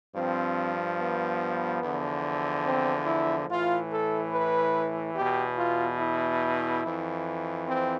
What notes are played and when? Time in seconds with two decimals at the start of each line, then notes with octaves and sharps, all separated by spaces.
0.15 G2 F3 C4
0.98 B3
1.82 E2 D3 F3
2.65 C4
3.07 E4
3.48 A2 E3 F4
3.91 A4
4.32 B4
5.15 E2 G4
5.20 B2
5.58 F4
5.99 E4
6.83 F2 E3
7.67 C4